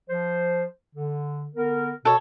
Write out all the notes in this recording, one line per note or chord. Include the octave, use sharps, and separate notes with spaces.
F3 C5
D3
D3 B3 A#4
B2 A4 C#5